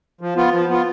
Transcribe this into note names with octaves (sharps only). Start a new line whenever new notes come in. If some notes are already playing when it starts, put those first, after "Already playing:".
F3
B3 F4
F3
B3 F4